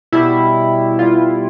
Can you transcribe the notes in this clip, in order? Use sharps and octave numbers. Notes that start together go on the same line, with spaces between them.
B2 G3 E4
B2 G3 F4